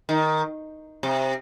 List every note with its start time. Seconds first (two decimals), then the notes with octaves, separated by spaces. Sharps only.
0.09 D#3
1.03 C3